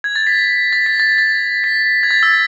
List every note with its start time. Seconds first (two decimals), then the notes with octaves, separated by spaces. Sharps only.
0.04 G#6
0.16 A6
0.27 B6
0.73 A6
0.86 B6
1.00 A6
1.18 A6
1.64 B6
2.03 G#6
2.11 A6
2.23 E6